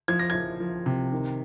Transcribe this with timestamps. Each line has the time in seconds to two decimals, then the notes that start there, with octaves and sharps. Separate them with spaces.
0.08 F3 G#6
0.19 A#6
0.30 F3 G#6
0.60 F3
0.86 C3
1.12 D#3